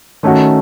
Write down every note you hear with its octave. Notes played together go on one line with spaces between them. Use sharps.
D#3 A3 C#4 F#4